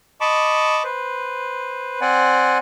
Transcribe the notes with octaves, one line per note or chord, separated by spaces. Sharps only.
D#5 A5 B5 C#6 D6
B4 C5
C4 C5 D5 F#5 G#5